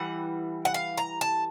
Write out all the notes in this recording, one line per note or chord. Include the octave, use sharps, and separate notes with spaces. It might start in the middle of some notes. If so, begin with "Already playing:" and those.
Already playing: E3 G3 F#5
F#5
F5
A#5
A5